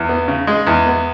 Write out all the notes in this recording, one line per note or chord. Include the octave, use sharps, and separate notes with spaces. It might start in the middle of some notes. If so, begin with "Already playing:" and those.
Already playing: E2
B3
C#3
G#3
E2
B3